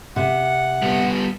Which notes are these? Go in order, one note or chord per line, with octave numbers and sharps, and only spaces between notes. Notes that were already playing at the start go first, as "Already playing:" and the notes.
C3 F#5
G3 B3